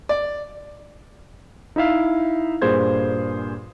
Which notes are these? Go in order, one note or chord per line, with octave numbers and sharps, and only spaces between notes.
D5
D#4 E4 E5 F5
G2 A#2 G#4 C5 G#6